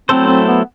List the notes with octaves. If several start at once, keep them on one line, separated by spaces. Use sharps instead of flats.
F#3 A3 C4 E4 A4 C5
C4
B3